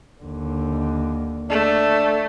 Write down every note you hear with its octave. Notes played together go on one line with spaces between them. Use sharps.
D#2 D3
A3 D4